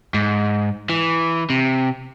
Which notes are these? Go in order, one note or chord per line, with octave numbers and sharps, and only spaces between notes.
G#2
E3
C3